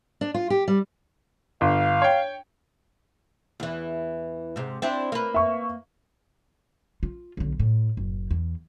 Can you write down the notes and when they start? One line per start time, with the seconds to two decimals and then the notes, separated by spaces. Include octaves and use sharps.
0.21 D4
0.34 F4
0.50 G4
0.68 G3
1.61 G1 F5
2.02 C#5 G5
3.60 E2 E3
4.56 G#2 C3
4.82 C4 D4 E4
5.12 A#3 B4
5.34 E5 C#6
7.03 F4
7.37 B1 D3
7.60 A2
7.97 F#1
8.30 E2